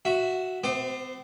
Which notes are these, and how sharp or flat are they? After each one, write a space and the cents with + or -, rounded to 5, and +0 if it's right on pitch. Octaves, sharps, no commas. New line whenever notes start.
F#4 +0 E5 +0
C4 -45 C5 +0 D6 +40